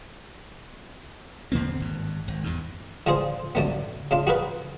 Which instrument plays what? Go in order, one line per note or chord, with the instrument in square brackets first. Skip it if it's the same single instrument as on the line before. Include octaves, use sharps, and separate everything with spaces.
[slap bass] E2 D3 A#3 C4
G#1 G2
G#1
E2 G2
[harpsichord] D3 F4 G#4 C5
F#2 D3 B3
C#3 D4 F4
F#4 G#4 A#4 B4